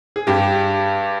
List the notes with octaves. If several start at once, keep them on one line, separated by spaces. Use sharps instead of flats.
G#4
G2 G4